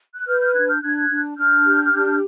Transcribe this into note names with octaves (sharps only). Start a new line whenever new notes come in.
F#6
B4 F6 G6
F6 G6
D4 F#6 G#6
F6 G6
D4 F#6 G#6
D4
D4 F6 G6
G4
D4